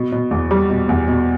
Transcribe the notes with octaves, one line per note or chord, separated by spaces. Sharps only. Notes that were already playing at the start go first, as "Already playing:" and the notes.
Already playing: B2
B2
E2
G3
B2
E2
B2